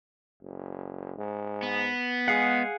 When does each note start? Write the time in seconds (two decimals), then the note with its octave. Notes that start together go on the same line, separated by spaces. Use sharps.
0.43 F#1
1.18 G#2
1.63 B3
2.28 G#3 G#4 F5 F#5